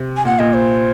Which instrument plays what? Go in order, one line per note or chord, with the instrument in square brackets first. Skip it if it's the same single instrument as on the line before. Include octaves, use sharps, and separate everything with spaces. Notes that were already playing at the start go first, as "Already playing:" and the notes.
Already playing: [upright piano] C3
[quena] G#5
[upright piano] A#2 [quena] F#5
[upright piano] A#2 [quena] D#5
[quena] C5